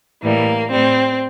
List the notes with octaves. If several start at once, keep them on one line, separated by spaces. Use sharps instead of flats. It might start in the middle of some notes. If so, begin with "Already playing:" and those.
A2 E3 G3 A#3
A2 G3 C4